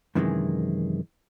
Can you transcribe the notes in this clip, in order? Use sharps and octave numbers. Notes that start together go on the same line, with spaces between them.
F#2 C3 D#3 E3 G3 G#3